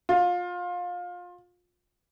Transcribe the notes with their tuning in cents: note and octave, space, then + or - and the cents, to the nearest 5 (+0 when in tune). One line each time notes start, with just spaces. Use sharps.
F4 +25